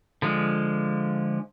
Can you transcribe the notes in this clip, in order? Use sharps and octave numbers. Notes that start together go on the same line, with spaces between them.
D3 F3 G#3